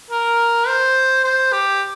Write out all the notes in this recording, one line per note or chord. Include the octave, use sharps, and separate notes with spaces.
A#4
C5
C5
G4